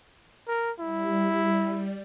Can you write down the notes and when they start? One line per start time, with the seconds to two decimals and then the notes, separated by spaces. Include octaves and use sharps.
0.48 A#4
0.79 G3 E4